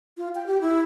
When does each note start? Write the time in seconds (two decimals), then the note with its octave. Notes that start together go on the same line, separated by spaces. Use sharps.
0.18 F4
0.35 G5
0.46 G4
0.61 E4